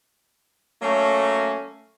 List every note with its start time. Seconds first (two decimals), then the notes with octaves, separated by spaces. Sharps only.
0.82 F#3 A3 A#3 C#4